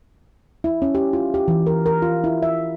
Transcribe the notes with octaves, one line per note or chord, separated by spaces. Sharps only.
E4
C#4
G4
F4
G4
E3
A#4
A#4
F4
E4
E5